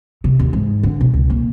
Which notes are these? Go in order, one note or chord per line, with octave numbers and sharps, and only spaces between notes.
C3
D#2
G#2
D3
B2
C#2
A#3